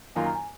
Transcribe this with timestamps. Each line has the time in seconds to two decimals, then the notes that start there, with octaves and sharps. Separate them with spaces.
0.16 F#2 D#3 A#3 F4 G#5
0.26 A#5
0.35 G#5